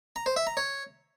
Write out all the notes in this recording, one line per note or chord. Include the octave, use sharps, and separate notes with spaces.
A#5
C5
E5
A#5
C#5